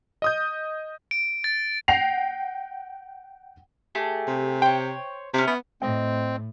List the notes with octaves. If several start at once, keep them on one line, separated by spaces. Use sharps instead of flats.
D#5 D#6 G6
D7
A6
F#5 G5 A#6 C7 F7
A3 G4 G#4
C3
C5 C#5 G5
C3 C#4 E4
B3
A2 C4 D#5 G5